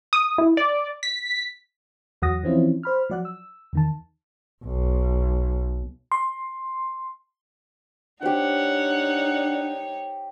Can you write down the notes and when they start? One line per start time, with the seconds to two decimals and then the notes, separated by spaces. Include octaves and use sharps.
0.13 D#6
0.38 E4
0.57 D5
1.03 B6
2.22 E2 F#3 F#5 D#6 A#6
2.43 E3 F3 C4 C#4 E4 F4
2.83 C5 B5 F6
3.10 F3 F#3 D5 F#5 F#6
3.25 E6
3.73 E2 D#3 A5
4.65 B1
6.12 C6
8.22 D4 D#4 G4 C5 C#5 F#5